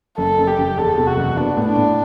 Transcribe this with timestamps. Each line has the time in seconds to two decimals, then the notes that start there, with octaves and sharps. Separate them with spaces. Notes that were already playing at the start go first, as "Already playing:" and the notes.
0.18 F#1 A4
0.38 F#1
0.47 G4
0.58 F#1
0.77 E2 A4
0.98 C3
1.07 F#4
1.17 F#1
1.37 B3 D4
1.57 A2
1.67 D4
1.77 A2